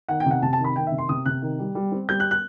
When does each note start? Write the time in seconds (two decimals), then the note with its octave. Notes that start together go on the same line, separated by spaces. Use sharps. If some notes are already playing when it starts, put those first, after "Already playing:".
0.08 D#3 F#5
0.20 G5
0.26 C3 F#5
0.42 C3 A5
0.53 A5
0.59 D#3
0.64 B5
0.76 D#3 G5
0.87 E5
0.92 C3
0.98 C6
1.09 C3 D#6
1.26 C3 F#6
1.42 D#3
1.59 G3
1.75 G3
1.92 C4
2.09 G3 G6
2.20 F#6
2.31 F#6